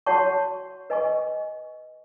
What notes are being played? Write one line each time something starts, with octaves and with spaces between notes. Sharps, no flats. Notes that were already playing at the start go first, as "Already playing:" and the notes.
F#4 C#5 F#5 A5 C#6
B4 D#5 G#5 C#6